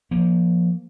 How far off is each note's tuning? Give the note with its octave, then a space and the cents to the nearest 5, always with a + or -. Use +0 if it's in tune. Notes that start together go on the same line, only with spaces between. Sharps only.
F3 +0 A#3 +15